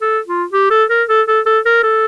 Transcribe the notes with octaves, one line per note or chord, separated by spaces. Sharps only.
A4
F4
G4
A4
A#4
A4
A4
A4
A#4
A4